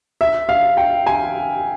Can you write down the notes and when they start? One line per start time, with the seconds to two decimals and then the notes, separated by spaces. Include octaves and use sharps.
0.21 E5
0.49 F5
0.77 G5
1.07 G#5